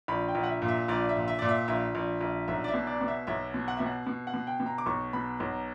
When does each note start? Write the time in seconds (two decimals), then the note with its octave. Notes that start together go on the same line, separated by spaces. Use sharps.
0.08 A#1 B5
0.29 G5
0.35 A#1
0.43 F#5
0.48 E5
0.62 A#2
0.68 E5
0.88 A#1 D5
1.09 E5
1.15 A#2
1.28 E5
1.39 A#2 D5
1.49 E5
1.68 A#1 E5
1.95 A#1
2.21 A#1
2.48 B1 E5
2.64 D5
2.68 E5
2.74 B2
2.87 D5
3.01 B2
3.08 E5
3.27 B1 E5
3.54 B2
3.68 F#5
3.77 B2 E5
3.86 F#5
4.07 B2
4.27 F#5
4.34 B2
4.47 G5
4.60 B2
4.66 A#5
4.78 D6
4.86 B1 C#6
5.13 B2 B5
5.40 B1 A#5